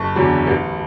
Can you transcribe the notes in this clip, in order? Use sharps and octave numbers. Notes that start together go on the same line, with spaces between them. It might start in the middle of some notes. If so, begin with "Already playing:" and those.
Already playing: F#1 A5 C#6
E2 D3 F#3
A1